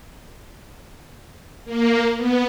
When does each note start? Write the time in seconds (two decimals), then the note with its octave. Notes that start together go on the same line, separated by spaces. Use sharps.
1.64 A#3
2.16 B3